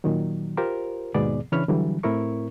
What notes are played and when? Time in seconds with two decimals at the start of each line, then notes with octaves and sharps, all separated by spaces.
0.04 A#2 D#3 F#3
0.57 F4 G4 A#4 C5
1.14 D#2 G#2 B2 B3 G#4 D5
1.52 C#3 E3 D4 C#5 B5 F6
1.68 D3 E3 F#3 G3
2.03 A2 C4 E4 A#4 C#6